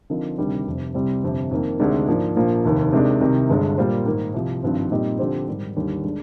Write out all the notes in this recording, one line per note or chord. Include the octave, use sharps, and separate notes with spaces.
D3 F3 C4 D#4 A#4
D2 C3 D#3 G3 D4
F1 F2 C3
C2 C3 G3 C4
G1 F2 C3
F2 D#3 A#3
D2 C3 D#3 G#3 D4
G#2 F3 A#3 D4
A#1 A#2 F3 A#3
F1 D#2 D#3
C3 D#3 G#3 D4
C2 C3 D#3
G1 G2 D3 G#3
A#2 G3 A#3 F4 C5
G#2 D#3 A#3
C2 C3 F3
G#1 G2 F3 C4
A#2 G3 C4 D#4 G4
D3 F3 C4 G4 C5
G#2 D#3 G3
D#2 D3 G3
D3 G#3 D4